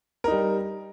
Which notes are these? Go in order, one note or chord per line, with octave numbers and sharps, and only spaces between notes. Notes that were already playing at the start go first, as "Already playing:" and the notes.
G3 D#4 A#4